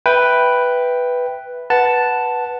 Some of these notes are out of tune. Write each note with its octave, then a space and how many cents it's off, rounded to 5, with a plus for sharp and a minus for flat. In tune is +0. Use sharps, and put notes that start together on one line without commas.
B4 +0 E5 +0 G5 +0
B4 -5 F#5 +0 A5 +0